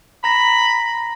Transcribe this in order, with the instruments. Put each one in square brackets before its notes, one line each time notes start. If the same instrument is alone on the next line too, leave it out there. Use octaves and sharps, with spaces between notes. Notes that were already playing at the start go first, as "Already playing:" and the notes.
[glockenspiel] A#5 A#6 [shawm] B5